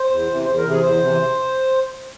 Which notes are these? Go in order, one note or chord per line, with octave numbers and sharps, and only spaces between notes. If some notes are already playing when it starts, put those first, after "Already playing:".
Already playing: C5
E2
C3 E3
E2 C5
A#4
C3 E3
G#4
E2 C5
C3 E3